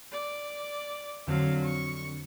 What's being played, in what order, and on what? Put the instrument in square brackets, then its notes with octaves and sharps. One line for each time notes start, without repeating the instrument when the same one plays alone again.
[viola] D5
[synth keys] F2 D3 C4 [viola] F#3 F5
[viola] C#6